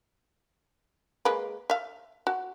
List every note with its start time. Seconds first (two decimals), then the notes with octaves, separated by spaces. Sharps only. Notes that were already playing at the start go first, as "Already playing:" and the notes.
1.25 G#3 A#3 B4
1.70 E5 F5
2.27 F#4